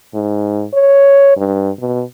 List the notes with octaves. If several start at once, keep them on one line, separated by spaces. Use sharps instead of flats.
G#2
C#5
G2
B2